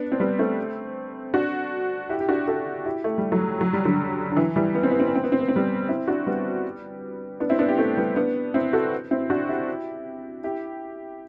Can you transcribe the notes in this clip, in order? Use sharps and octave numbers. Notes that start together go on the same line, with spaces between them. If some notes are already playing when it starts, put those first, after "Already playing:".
Already playing: B3 D4
C4
G3 B3
A3 C4
D4 F#4
E4 G4
G4
D4 F#4
F#4 A4
E4 G4
A3
G3
F#3 A3
F#3
G3
D3 F#3
D3
E3
E3 G3
B3
C4
B3
C4
B3
C4
B3
C4
B3
C4
G3 B3
C4 E4
D4 F#4
G3 B3
B3 D4
C4 E4
B3 D4
E4 G4
A3 C4
G3 B3
B3 D4
C4 E4
F#4 A4
C4 E4
D4 F#4
E4 G4
E4 G4